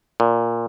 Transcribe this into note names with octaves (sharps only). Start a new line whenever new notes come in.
A#2